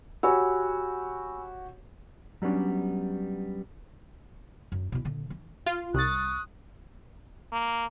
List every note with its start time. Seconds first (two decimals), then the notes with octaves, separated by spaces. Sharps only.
0.23 F#4 G4 C#5 G#5 B5 E6
2.42 F#3 G3 B3 C#4 D4
4.72 F#2
4.92 B2 E4
5.05 A#2 D3
5.30 E3
5.66 F4
5.94 C2 C#6 D#6 F#6 A6
7.52 A#3